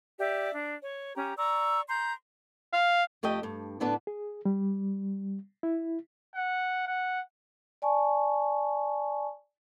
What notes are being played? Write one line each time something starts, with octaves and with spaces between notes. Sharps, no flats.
G4 D5 E5
D4
C#5
C#4 G4 A#5
D5 A#5 C#6 E6
A#5 C6 G6
F5
F2 A3 G4 D#5 G5
G2
A2 D3 B3 D4 A4 B4
G#4
G3
E4
F#5
F#5
D5 G#5 A5 C#6